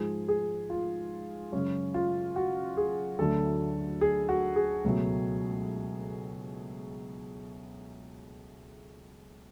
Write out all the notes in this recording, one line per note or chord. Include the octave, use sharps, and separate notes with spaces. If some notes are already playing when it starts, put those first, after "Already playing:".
Already playing: G#2 F3 G#3 G#4
G#4
F4
F#2 C#3 G#3 C#4
F4
F#4
G#4
D2 D3 F#3 A3 A4
G#4
F#4
G#4
C#2 B2 F#3 A3